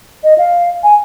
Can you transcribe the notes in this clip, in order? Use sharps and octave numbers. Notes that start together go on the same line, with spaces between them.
D#5
F5
G#5